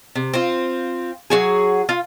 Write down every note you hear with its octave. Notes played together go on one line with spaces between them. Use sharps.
C3
C4 F4
F#3 F#4 G#4
F4